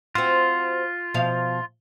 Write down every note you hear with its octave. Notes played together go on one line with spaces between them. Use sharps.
C4 F4 F#4
B2 F3 F5